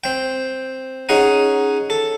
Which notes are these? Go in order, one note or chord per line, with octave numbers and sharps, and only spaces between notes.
C4 G5
C#4 D#4 G#4 F#5 G#5
A4